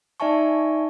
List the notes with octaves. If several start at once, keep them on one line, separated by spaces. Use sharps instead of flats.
D#4 D5 E5 G#5 A5 C#6